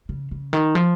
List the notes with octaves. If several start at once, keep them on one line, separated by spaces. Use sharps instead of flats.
C#3
C#3
D#3
F3